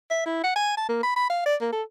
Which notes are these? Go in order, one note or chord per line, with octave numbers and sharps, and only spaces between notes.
E5
E4
F#5
G#5
A5
A#3
B5
B5
F5
D5
A#3
A4